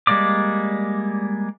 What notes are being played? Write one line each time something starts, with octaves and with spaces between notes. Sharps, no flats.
G3 G#3 A#3 D5 D6